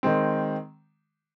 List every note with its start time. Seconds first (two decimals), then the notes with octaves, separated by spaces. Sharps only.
0.03 D#3 G#3 C4